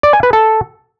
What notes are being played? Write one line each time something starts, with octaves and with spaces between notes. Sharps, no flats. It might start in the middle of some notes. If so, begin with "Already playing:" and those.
D5
G#5
B4
A4